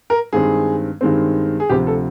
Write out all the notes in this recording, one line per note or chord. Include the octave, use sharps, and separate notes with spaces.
A#4
G2 D#3 G#3 C4 G#4
G2 D#3 G#3 C4
G#4
D2 C3 F3 G4
A4